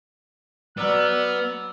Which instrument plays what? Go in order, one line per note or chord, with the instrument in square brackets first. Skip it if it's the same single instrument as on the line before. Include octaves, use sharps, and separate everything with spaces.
[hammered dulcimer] F#3 D5 [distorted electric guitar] B3 [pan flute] E6 [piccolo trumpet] F6